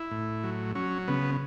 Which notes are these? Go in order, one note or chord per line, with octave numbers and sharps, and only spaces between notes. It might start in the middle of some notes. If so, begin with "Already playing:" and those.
Already playing: E4
A2
F#3
F#3 C#4
C#3 B3